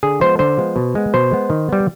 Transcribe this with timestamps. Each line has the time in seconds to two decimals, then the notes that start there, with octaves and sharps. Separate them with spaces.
0.03 D3 G#4
0.21 F3 G#3 B3 C5
0.39 D3 C5
0.57 F3 G#3 B3
0.76 B2
0.95 G#3 B3
1.14 B2 C5
1.31 G#3 B3
1.50 D#3
1.69 G3 B3